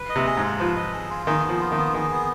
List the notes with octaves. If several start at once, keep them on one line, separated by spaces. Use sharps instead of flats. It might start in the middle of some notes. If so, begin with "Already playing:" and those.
Already playing: B4
D#5
C3
G#4
G#2
F4
F3 B4
D#5
G#4
F4
D#3 G#4
F3 B3
F4
D#3
B3
D#3 G#4
B3